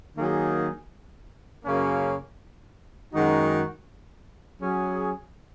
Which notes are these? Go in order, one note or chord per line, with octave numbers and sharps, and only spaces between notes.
D#3 F#3 A#3 D#4 G#4
F#2 C#3 A#3 C#4
F#2 D#3 G#3 D#4 F#4
F#3 C#4 G#4